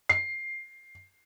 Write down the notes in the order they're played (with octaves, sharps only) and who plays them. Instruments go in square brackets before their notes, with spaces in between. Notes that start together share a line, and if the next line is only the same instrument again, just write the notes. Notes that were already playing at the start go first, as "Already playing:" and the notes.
[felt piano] C7